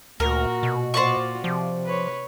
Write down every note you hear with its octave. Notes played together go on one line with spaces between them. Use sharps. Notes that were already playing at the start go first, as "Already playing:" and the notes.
D2 A#2 F#4 A#4
B2
A#2 F4 F#4 C5 D5 C#6
C3 F3
B4 C#5